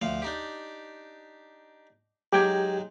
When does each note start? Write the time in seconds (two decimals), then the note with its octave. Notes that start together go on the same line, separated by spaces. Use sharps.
0.02 D2 F3 F5
0.22 D4 D#4 G4
2.33 F#3 G#3 D#4 G4 G5 G#6